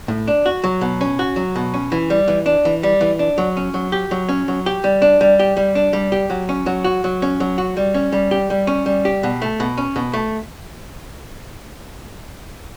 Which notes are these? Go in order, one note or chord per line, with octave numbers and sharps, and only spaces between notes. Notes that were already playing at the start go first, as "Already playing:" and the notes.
A2
D4
F#4
F#3
B2
C#4
F#4
F#3
B2
C#4
E3
G3
E3
D4
E3
G3
E3
D4
F#3
C#4
F#3
G4
F#3
C#4
F#3
G4
G3
D4
G3
G4
G3
D4
G3
G4
F#3
C#4
F#3
F#4
F#3
C#4
F#3
F#4
G3
C#4
G3
G4
G3
C#4
G3
G4
B2
A3
B2
C#4
B2
A3